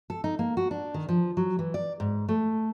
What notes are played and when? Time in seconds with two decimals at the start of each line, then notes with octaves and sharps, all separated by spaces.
0.10 A4
0.24 D#4
0.39 A#3
0.57 F#4
0.71 D4
0.94 D#3
1.09 F3
1.37 F#3
1.59 E3
1.74 D5
2.00 G#2
2.29 A3